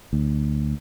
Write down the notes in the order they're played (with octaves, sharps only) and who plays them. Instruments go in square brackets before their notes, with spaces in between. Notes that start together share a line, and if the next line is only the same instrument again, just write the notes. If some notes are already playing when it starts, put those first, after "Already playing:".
[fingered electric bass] D2